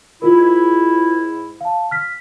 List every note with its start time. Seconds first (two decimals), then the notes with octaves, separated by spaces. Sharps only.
0.22 G#2 E4 F4 A#4
1.61 F5 A5
1.91 F6 B6